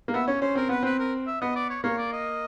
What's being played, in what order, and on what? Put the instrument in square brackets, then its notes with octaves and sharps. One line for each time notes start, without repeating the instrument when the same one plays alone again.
[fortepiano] A#3
[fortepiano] B3 [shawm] E5
[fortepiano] C#4 [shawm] C#5
[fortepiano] C#4 [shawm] C5
[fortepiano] C4 [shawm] A#4
[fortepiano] B3 [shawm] B4
[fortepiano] C4 [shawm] B4
[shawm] A#4
E5
[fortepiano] B3 [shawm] D#5
[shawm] D5
C#5
[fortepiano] A#3 [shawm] C#5
[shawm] D5
D#5